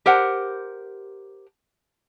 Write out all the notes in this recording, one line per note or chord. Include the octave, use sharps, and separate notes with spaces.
G4 A#4 C5 F#5